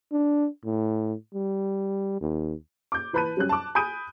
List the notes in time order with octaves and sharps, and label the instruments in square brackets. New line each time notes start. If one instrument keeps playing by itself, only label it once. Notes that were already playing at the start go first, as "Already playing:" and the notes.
[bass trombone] D4
A2
G3
D#2
[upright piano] D6 G6
E3 B4 A5 B5 F#6 D#7
F#3 G3 C#4 F#6
A5 D6
G#5 B5 D#6 G6 D7 D#7